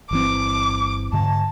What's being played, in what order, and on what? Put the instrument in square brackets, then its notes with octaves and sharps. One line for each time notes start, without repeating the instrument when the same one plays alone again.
[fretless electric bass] G1 E3 C4 [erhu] D6
[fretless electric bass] G#2 D3 [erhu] A5